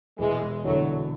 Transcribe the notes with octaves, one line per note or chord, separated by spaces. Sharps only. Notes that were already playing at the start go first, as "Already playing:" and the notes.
E1 E3 G#3
E2 D3 F#3 A3